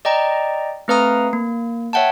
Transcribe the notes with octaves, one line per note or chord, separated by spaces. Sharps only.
D5 D#5 G5 A#5
A3 C4 B4 F5 A#5 D#6
A#3
C#5 E5 F#5 G5 A5